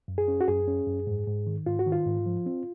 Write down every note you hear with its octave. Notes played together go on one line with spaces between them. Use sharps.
F#2
G#4
C#4
F#4
F#2 G#4
C#4
F#2
G#2
G#2
D#3
G#2 F4
F#4
D#3
F4
G#2
F3
C4